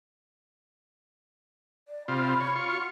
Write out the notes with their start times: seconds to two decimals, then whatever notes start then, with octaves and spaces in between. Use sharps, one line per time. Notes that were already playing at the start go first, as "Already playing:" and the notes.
1.88 D5
2.08 C3 F4 B5
2.40 C#5
2.56 F4 C#6
2.70 F#4